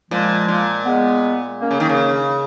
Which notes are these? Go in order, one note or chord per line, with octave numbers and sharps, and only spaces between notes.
A#2 F3 G#3
A#2
G#3 B3
A#3 C#4
C#3
D#3
C#3